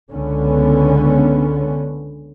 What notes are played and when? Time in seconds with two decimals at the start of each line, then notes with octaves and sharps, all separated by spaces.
0.11 C#2 D3 B3 C#4